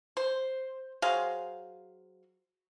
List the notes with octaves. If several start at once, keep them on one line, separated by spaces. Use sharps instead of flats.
C5
F#3 G#4 C5 F5